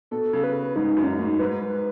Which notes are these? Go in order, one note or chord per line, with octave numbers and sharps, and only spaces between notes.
B2 A4
C#3 A4
B4
G#2 D#4
F#2
C#4
D#4
A2
G#2 B4
G#2